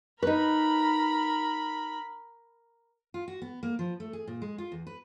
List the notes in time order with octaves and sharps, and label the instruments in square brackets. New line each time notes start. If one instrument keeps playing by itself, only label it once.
[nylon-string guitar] D#4 B4 [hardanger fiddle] A#4 B5
[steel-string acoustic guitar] F4
F#4
B3
A#3
F3
A3
G#4
A#2
G#3
F4
E2
B4